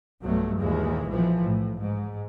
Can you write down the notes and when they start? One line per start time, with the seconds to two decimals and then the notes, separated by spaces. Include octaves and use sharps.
0.21 B1 G2 B2 F#3 A3
0.57 D#2 A#2 E3 G#3
1.10 B1 E3 F3
1.44 A2
1.80 G#2